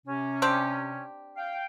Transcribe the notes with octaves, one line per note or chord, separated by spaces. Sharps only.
C3 C#4
C4 D4 G4
F5 G5